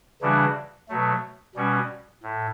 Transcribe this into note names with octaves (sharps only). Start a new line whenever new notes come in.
C#3 E3 G3 D4 F#4
B2 F#3 A3
B2 G3 C#4 F#4
A2